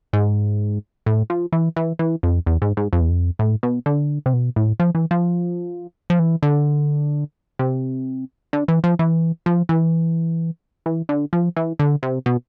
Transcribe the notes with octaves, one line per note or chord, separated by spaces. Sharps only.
G#2
A2
F3
E3
E3
E3
F2
E2
G#2
G#2
F2
E2
F2
A2
B2
D3
C3
B2
A2
F3
E3
F3
F3
E3
D3
C3
D3
E3
F3
E3
F3
E3
E3
D3
F3
E3
D3
C3
B2